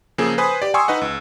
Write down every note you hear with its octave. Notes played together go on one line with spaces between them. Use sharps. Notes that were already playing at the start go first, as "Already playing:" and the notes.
C#3 F3 A#3 G#4 A4
B4 C5 G#5 B5 D#6
G4 D5
G5 G#5 C6 C#6 D#6 E6
D#4 B4 D#5 F#5
C#2